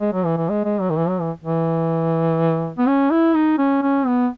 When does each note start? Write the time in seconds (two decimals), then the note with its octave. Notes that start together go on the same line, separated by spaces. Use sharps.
0.01 G#3
0.13 F#3
0.25 E3
0.37 E3
0.49 G#3
0.65 G#3
0.81 F#3
0.90 D#3
0.97 E3
1.08 F#3
1.21 E3
1.44 E3
2.78 B3
2.87 C#4
3.11 E4
3.34 D#4
3.58 C#4
3.82 C#4
4.06 B3